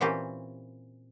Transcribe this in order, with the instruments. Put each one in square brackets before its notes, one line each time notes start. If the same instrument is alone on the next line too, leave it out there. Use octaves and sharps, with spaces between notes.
[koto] A#2 E3 C4 C#4 G4